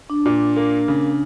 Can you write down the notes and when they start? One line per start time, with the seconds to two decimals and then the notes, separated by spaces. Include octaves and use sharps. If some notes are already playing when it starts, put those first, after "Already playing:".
0.10 D4
0.26 A#2
0.56 A#3
0.88 C#3